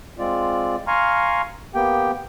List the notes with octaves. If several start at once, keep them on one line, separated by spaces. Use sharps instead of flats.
G#3 C4 F4 D5
F5 G#5 A#5 C6 C#6 F6
A#3 B3 G4 G5